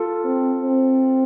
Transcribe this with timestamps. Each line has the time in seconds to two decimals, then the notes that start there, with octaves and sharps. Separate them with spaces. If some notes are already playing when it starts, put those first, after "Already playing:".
Already playing: F4 A4
0.24 C4
0.62 C4